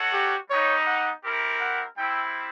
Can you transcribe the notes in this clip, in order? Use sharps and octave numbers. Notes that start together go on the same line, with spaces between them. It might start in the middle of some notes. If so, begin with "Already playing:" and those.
Already playing: D#4 F#4 A4 C#5 F#5
G4
G3 B3 D#4 G4 C#5
F#5
C4 E4 G4 A#4
F#5
G3 C4 E4 G5